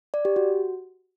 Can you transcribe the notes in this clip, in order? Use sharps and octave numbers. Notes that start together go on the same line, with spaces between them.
D5
G4
F#4